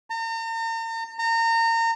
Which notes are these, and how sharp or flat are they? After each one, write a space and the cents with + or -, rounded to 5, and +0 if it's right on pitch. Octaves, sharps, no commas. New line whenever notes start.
A#5 -40
A#5 -30